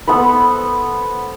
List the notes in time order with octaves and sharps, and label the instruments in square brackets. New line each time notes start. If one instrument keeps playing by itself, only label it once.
[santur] B3 A4 C5 B5